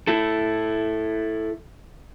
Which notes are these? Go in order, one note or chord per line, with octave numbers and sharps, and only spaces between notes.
E4 A4